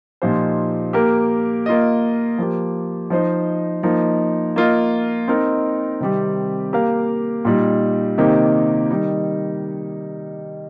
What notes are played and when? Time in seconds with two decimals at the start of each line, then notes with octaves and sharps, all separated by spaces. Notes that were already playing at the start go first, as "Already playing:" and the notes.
0.22 A#2 F3 D#4 G4 C5
0.93 A#3 G4 A#4
1.66 A#3 F4 D#5
2.38 F3 A#3 G4
3.10 F3 D#4 C5 D#5
3.83 F3 A#3 D#4
4.56 A#3 F4 D#5
5.28 C4 D#4 A#4
6.00 C3 D#3 G3 C4 G4
6.73 A#3 G4 A#4 F5
7.45 A#2 G3 D#4
8.18 C3 D#3 A#3 D#4 G4
8.90 D#3 G3 D#4